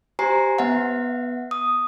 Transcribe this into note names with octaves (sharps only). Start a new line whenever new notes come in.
G4 C5 G#5 A#5 C7
B3 E5 F#5
D#6